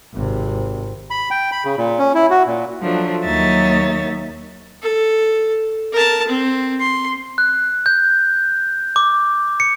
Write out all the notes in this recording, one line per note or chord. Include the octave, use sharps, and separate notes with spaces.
G#1 C3
B5
G5
B5
C#3
A#2
C#4
E4
F#4
A#2
F3 F#3 A3 D4
D#2 F#3 D#4 C#5 E5 A6
A4
A#4 A5
C4
C6
F#6
G6
D6
C#7